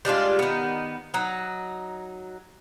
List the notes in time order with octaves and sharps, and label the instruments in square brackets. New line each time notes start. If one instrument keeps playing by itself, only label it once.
[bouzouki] G3 G#3 D4 F4
D#3 B3
F#3 D#4